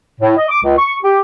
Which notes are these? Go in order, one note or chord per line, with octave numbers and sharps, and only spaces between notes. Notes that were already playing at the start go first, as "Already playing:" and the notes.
A2
D#5
D6
C#2
C#6
G4